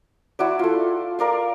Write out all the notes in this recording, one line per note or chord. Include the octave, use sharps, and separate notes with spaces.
E4 F#4 D5
F4 A4
A#4 D5 F5